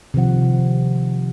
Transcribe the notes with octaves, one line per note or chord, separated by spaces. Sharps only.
C3 D#3 F3 F#5